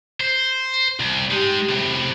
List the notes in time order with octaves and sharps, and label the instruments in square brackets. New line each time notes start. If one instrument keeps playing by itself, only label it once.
[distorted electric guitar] C5
C2
[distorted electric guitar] G#3 D#4 [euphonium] G4
[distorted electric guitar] A2 C3